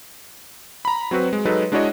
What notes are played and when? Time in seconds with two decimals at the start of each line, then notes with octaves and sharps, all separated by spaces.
0.85 A#5 B5
1.11 F#3 C4 F#4 B4
1.33 G#3
1.45 F#3 G#3 D#4 A4 B4
1.72 G#3 D4 E4 F#4 C#5 D#5